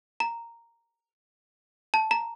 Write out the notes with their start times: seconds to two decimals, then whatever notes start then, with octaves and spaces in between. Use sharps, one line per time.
0.20 A#5
1.94 A5
2.11 A#5